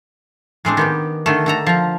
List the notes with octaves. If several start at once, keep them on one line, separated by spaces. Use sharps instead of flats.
A2 G#3 C4 D4
D#3 B3 G4
D3 D#3 A3
D3 A4 A#5
F3 A#5